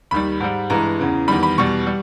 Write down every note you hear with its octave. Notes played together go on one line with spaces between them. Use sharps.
D#2 D#3 G3 B5
G#2 G3
G2 E3 G#3 A#5
E2 C#3 E3
E2 D#3 G3 B5
B5
E2 B2 G3 C#6
G3